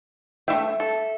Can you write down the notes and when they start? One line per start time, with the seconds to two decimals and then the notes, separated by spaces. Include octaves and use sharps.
0.48 A3 F4 E5 G5
0.80 A4